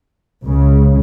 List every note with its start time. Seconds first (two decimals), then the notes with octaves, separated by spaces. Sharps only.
0.44 C#2 C#3